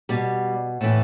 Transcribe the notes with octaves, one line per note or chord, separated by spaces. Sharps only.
B2 G3
A2 E3